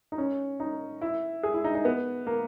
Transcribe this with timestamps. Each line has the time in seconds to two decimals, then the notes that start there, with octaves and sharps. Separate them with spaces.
0.12 D#4
0.18 C#4
0.60 D#4
1.01 E4
1.43 G#4
1.54 E4
1.64 D#4
1.75 D#4
1.85 B3
2.27 A#3